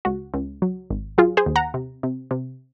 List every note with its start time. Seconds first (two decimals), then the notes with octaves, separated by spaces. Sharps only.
0.05 C#2 F#4
0.34 C#2
0.62 F#3
0.90 G#1
1.18 F#3 F4 G#4
1.37 G#4 C5
1.46 D#2
1.56 F#5 A#5
1.74 C3
2.03 C3
2.31 C3